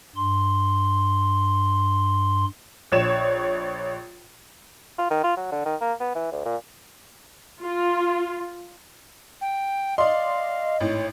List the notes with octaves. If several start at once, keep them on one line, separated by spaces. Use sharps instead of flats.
G2 C6
A#1 C#5 E7
F4
D#3
F4
F#3
D3
D#3
A#3
B3
E3
D2
A#2
F4
G5
D5 D#5 F5 C6
G#1 A2 C#5